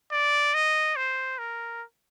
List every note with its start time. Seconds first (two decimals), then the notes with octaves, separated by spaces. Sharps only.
0.12 D5
0.54 D#5
0.96 C5
1.39 A#4